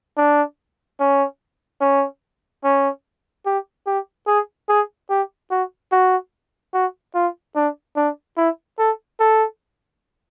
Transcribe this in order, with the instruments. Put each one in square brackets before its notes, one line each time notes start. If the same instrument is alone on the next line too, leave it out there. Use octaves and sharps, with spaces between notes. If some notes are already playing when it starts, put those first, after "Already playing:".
[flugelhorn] D4
C#4
C#4
C#4
G4
G4
G#4
G#4
G4
F#4
F#4
F#4
F4
D4
D4
E4
A4
A4